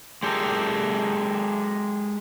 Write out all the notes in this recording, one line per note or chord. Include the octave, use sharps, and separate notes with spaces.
G#3 G4 A4 A#4